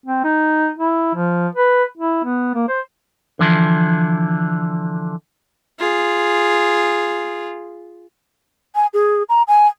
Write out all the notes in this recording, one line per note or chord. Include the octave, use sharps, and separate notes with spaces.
C4
D#4
E4
F3
B4
E4
B3
A#3
C5
D3 E3 F3
F4 G#4
G#5
G#4
A#5
G#5